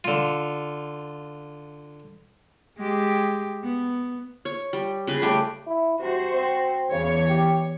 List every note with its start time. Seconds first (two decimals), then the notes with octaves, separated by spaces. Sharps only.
0.04 D3 F4
2.79 G#3 G4
3.63 B3
4.45 C#5
4.73 G3
5.07 C#3 B4
5.22 G3 A3 G4
5.67 E4
5.99 C3 F#4 C5
6.34 C4
6.91 E2 C#3 C#5
7.29 G4